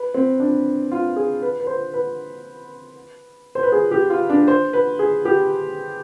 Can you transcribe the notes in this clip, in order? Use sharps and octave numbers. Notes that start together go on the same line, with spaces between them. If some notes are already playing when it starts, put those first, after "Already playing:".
Already playing: B4
C4
D4
F4
G#4
B4
B4
C5
B4
C5
B4
G#4
G4
F4
D4
C5
B4
G#4
G4